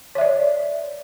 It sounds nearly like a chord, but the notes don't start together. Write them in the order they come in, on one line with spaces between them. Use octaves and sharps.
C#5 E5 D5